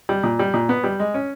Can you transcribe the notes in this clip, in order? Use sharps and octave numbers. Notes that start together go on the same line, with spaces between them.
G3
A#2
G3
A#2
B3
G3
G#3
C#4